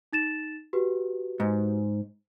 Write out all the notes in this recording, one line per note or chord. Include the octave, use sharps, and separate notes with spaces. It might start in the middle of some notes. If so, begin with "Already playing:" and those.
D#4 A6 E7
F#4 G4 B4
G#2